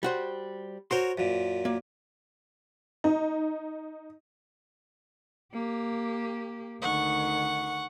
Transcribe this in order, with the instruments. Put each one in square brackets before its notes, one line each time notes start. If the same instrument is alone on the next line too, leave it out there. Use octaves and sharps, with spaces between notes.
[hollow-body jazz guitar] G3 F#4 C5
[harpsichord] F#4 A#4 C#5 [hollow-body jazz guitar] C5 C6
[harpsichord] F#2 A#2
[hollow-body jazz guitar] A#3
[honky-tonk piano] D#4
[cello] A#3 G4
[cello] D2 D#3 [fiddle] F#5 C#6